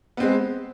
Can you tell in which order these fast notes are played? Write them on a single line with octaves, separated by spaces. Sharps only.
B3 C4 G#3